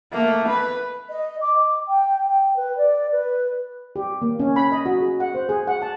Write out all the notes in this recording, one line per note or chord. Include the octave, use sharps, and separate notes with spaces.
A3 A#3
B4
D#5
D6
G5
G5
B4
D5
B4
G4
A#3
C#4
B5
D#5
F#4
G#4
F#5
C5
G#4
F#5
A5